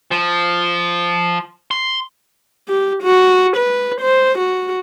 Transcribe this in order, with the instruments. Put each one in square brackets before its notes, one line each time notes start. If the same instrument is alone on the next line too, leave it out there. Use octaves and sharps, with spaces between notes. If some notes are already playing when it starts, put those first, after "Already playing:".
[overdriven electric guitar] F3
C6
[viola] G4
F#4
B4
C5
F#4